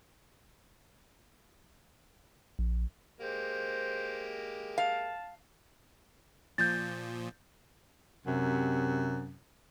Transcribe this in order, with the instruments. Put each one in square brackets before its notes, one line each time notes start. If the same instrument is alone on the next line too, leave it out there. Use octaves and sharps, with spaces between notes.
[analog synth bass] A#1
[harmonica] G#3 A#3 G4 [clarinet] C5
[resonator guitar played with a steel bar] F5 [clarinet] A5
[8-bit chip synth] A#2 F3 [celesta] G6 A6
[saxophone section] F#2 C3